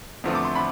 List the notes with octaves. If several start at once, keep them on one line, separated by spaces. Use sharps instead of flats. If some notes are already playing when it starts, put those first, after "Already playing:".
E2 D3 F3 A3 C4
D6
C6
D3 B5